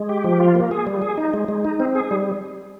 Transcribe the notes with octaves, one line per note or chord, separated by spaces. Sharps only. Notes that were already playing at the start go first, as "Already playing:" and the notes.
Already playing: G#3
G4
F3
F4
A#3
G#4
G3
G#4
D#4
G#3
G#3
D#4
C4
G#4
G3